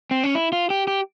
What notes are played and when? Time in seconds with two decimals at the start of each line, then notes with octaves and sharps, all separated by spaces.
0.11 C4
0.23 C#4
0.35 E4
0.52 F4
0.70 G4
0.87 G4